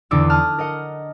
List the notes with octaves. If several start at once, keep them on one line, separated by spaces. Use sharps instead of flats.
E2 D3 E3 D4 D6 E6
A5 D#6 F6 F#6
A#4 D#5 F#5